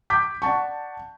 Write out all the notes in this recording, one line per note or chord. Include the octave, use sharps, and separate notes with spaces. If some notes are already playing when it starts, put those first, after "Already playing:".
D6 G6 B6
D5 F#5 A5 C#6